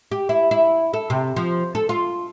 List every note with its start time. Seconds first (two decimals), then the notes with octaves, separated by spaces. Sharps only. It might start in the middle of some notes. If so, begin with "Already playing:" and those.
0.11 G4
0.29 E4
0.51 E4
0.93 A4
1.10 C3
1.36 F3
1.75 A4
1.89 F4